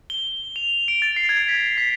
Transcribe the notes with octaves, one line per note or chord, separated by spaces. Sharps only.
G7
F7
D7
A6
C7
G#6
B6
B6